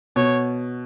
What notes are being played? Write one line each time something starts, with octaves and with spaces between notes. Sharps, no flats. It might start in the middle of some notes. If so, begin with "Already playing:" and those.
B2 C#5